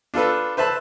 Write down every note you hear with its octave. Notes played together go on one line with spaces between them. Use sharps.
D4 F4 A4 B4
B4 C5 E5 A5 B5